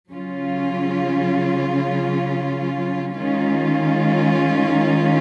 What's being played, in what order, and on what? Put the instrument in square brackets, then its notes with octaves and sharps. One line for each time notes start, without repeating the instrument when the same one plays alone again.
[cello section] C#3 F#3 C#4 F4
D#3 G#3 C#4 F4